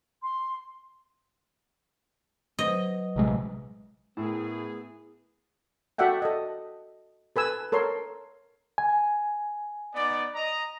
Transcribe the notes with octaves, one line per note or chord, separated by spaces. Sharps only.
C6
F#3 B4 D#5
A#1 C3 G#3
A2 B3 E4 G#4 A#4
F#4 A4 D5 E5 F#5 G5
A4 D#5
A4 B4 G#5 E6
A4 A#4 C#5 C6
G#5
B3 D#4 D5
D#5 A#5